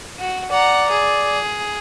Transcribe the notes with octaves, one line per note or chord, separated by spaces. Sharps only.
F#4
D5 F#5 A#5
G#4